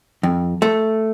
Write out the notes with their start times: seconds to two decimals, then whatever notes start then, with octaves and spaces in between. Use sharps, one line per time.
0.23 F2
0.62 A3